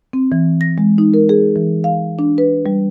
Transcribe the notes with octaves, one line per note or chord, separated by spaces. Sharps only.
C4
E3
A#6
G#3
D#4
A#4
G#4
E3
F5
D4
B4
G3